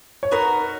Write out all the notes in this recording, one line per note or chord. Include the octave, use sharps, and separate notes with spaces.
C#5
D#4 F#4 A#4 B4